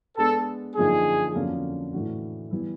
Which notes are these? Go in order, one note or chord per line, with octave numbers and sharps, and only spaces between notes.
G#3 B3 D4 A4
F#2 D3 F3 A#3 D#4 G#4
F2 D3 F#3 A#3 C#4
A2 E3 A3 D4 F#4
E3 G3 B3 E4